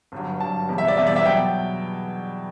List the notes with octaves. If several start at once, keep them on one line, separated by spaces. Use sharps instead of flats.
G1 G2 F#3
G1 G2 F#3 A5
E2 B2 G3
E5
D5
E2 B2 G3 E5
D5
E5
B2 F#3 G5